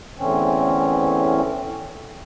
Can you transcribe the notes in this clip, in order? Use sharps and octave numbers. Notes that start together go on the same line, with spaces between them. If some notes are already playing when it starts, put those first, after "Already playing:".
E2 A2 D3 E3 C4 C#4